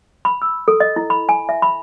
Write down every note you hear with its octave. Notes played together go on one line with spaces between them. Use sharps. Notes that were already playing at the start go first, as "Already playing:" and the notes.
B5
E6
A4
D#5
E4
B5
G#5
E5
B5